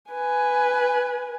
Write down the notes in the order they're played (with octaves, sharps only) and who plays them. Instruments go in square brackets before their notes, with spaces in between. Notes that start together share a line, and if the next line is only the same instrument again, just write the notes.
[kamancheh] B4 G#5